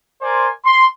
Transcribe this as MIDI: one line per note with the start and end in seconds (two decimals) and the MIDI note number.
0.22 0.48 70
0.22 0.48 72
0.22 0.48 74
0.22 0.48 80
0.22 0.48 84
0.64 0.84 84